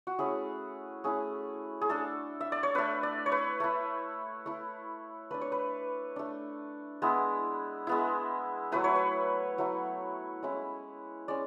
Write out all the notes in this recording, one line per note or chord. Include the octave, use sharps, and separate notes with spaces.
F#4
A3 C#4 E4 G#4
A3 C#4 E4 G#4
G#4
A3 D4 A4
E5
D5
C#5
A3 D4 B4
D5
C#5
B4
A3 E4
A3 E4
A3 D4 B4
C#5
B4
A3 D4
G#3 B3 E4
G#3 B3 E4
F#3 A3 E4 B4
C#5
B4
F#3 A3 E4
G#3 C#4 E4
G#3 C#4 D5